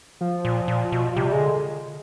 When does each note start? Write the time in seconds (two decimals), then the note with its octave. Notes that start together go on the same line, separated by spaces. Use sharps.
0.21 F3
0.45 A#2
0.68 A#2
0.92 B2
1.16 C3 G3
1.33 C#3 G#3
1.40 D3